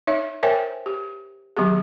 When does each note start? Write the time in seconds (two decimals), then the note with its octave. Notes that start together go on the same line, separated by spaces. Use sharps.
0.07 D#4 C#5 E5
0.43 A#4 C5 C#5 E5 G5 G#5
0.86 G4
1.57 D#3 F#3 B3 G4 G#4